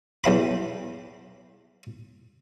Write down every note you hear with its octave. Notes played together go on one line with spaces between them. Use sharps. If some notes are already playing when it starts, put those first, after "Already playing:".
B1 E2 E5 B5